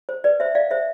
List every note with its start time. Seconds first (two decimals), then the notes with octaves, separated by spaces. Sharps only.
0.09 C5
0.24 B4 D5
0.40 C5 E5
0.55 D5 F5
0.71 C5 E5